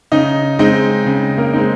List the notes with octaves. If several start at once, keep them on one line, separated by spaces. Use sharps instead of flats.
C#3 D#4 D#5
G#3 C4 D#4 D#5
C#3
A#3 A#4
G#3 C4 D#4